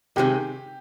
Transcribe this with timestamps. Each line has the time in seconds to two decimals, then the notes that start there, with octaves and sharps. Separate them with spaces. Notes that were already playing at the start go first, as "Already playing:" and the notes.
0.16 C3 D#3 G#3 G4